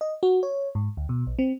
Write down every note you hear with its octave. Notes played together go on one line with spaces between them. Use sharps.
D#5
F#4
C#5
G#2
D2
B2
A#1
C4